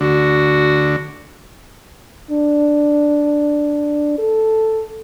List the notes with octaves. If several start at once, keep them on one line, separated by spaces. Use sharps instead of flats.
D2 D3 F#4
D4
A4